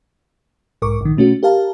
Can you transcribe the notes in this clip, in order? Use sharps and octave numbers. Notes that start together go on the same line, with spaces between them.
B1 G#2 A#4 C#6 D6
A#1 D#3
B2 A3 C#4 F#4
G4 A#4 F5 A5